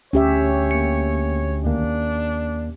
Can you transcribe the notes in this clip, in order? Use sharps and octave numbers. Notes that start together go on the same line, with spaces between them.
D2 C#4 G4 C#5 E5
A#3 C#7
D#2 A#3 D4